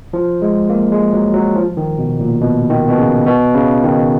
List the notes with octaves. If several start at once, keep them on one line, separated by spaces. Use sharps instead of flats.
F3
G#3
A#3
G#3
F#3
F#3
F3
D#3
B2
A#2
B2
D#3
B2
C#3
B2
C#3
D#3